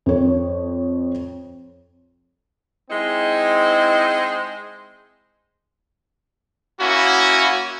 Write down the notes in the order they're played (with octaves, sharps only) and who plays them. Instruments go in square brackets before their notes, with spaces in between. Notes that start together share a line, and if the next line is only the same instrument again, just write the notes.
[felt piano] F2 C#5
[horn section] G#3 C4 D#4 E4 C5
[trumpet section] A#3 C#4 E4 F#4